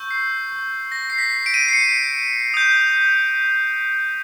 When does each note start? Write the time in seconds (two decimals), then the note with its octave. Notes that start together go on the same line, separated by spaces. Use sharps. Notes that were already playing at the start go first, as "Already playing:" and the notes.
Already playing: C#6 E6 G6
0.11 C7
0.92 A#6
1.10 C7
1.18 B6
1.46 D7
1.54 D#7
1.61 D7
1.68 C7
1.73 C#7
2.54 D#6 G6